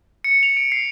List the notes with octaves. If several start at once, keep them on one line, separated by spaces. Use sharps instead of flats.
C#7
F7
D7
C7